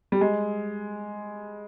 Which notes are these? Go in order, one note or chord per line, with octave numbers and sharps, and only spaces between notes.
G3
G#3